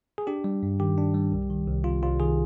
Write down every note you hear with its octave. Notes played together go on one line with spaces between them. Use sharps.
G#4
D4 G4
G3
G2
D#3 G4
D4
G3
C2
D#3
C2
C3 F4
C2 F4
D#3 G#4